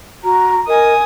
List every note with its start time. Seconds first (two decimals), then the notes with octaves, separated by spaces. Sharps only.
0.24 F#4 A#5
0.68 A#4 D#5 G#5 D#6